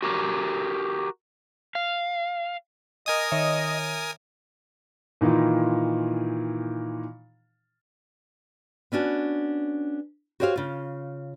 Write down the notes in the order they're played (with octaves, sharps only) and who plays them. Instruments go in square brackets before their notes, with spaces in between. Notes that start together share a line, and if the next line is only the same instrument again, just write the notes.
[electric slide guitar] F#4 G4 A#4
F5
[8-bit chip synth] A#4 G#5 D#6 [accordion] D#5
[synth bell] D#3 C#5 E5
[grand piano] A#2 D#3 E3 D#4 F4
[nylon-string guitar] B3 C#4 D4 F#4
F#4 G4 C5 C#5 E5 F5
C#3 F4